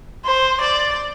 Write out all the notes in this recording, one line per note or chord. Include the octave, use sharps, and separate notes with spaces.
C5
D5